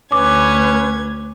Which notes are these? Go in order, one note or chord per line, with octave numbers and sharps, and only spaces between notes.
D2 C#4 B4 D6 G#6